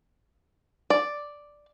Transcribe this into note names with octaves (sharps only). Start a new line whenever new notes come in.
D5